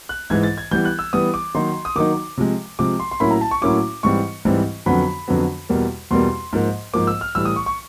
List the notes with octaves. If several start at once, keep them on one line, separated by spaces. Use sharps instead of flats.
F#6
G#2 E3 G#3 G#6
A6
G#6
E3 G3 B3 G6
F#6
E6
E3 G3 B3 D#6
D6
D#3 F#3 A#3 D#4 C6
D#6
D#3 F#3 A#3 D#4 D6
C3 F3 G#3
C3 F3 G#3 D6
C6
C6
A2 F#3 A#3 C#4 E4 B5
A#5
A5
C#6
A2 F#3 A#3 C#4 E4 D6
G#2 E3 G3 C4 C#6
G#2 E3 G3 C4
F2 D3 F#3 B3 B5
F2 D3 F#3 B3
E2 B2 G3 A#3
E2 B2 G3 A#3 C6
G#2 F3 A#3
G#2 F3 A#3 D6
E6
F6
A2 E3 G3 E6
D#6
C#6
C#6